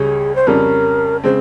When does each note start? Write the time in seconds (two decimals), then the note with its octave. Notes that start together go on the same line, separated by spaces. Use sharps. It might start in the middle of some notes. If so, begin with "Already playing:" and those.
Already playing: C#2 C#3 G3 C#4 G#4
0.35 C5
0.47 F2 C#3 G3 C#4 A#4
1.24 C#3 G#3 C4 C5